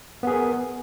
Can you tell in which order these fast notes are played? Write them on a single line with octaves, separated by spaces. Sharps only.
B3 G#4 A#4